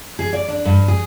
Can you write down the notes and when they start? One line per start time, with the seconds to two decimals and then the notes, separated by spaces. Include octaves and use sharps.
0.19 G#4
0.33 D5
0.48 D4
0.65 G2
0.88 G#4